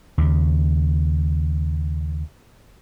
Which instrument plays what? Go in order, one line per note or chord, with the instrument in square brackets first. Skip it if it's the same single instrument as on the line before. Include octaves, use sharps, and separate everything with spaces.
[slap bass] D#2 C#3